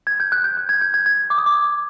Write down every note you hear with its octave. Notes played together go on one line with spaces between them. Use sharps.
G#6
G6
F#6
G6
G6
G#6
G6
G#6
G#6
D6
D#6
D6